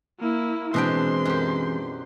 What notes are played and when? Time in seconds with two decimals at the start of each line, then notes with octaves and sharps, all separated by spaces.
0.19 A#3 E4
0.74 B2 E3 G#3 C4 D4 G5 C6
1.25 F#2 G4